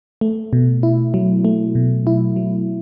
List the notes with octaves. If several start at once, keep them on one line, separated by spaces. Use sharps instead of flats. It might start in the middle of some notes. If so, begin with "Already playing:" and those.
A3
B2
E4
F#3
A3
B2
E4
F#3